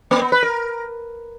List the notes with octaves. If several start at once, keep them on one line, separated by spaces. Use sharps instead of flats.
A#3
B3
B4
A#4